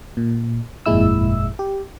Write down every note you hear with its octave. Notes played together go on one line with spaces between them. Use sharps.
A#2
G1 F2 A#2 G#3 E4 E6
G4